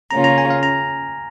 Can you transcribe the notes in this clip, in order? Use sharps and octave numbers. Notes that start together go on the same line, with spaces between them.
C#3 A#3 C#4 F4 A#5
A#5
G#5
F5
A#5